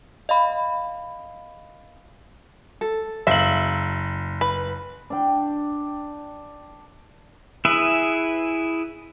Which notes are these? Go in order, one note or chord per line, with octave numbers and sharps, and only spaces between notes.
D#5 F5 B5
A4
F#1 E5 F5 F#7
B4
D4 G5
E4 G#4 B4 E5